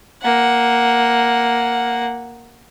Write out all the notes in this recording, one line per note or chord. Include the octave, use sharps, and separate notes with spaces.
A#3 F#5